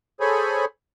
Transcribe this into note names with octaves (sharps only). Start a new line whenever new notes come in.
G#4 A4 C5 C#5 G#5 B5